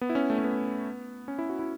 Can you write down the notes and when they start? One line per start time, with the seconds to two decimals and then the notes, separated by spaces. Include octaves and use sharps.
0.01 B3
0.10 E4
0.15 C#4
0.30 A3
0.39 C#4
0.44 B3
1.28 C#4
1.39 E4
1.49 F#4
1.59 E4